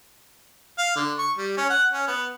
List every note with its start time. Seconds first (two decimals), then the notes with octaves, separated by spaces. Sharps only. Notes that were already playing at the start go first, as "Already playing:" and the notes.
0.78 F5
0.96 D3
1.18 C#6
1.38 G3
1.57 C#4
1.70 F#5
1.93 C#4
2.07 B3